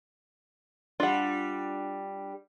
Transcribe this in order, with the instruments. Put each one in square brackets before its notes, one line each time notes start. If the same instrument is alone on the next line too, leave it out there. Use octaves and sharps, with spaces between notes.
[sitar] G3 D4 [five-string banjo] F4 F#5